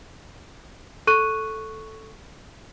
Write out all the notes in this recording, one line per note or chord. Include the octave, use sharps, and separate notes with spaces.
A4 C#6 F#6 D#7